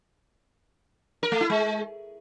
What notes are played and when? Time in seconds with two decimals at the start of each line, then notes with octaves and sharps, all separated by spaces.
1.23 A#4
1.32 A3
1.41 E4
1.50 G#3